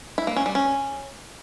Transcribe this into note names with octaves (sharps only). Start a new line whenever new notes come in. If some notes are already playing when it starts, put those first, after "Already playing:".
E4
A#3
C#4
G3
C#4